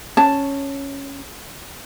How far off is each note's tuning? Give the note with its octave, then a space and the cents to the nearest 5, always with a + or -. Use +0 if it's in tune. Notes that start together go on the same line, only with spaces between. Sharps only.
C#4 +0 A5 +0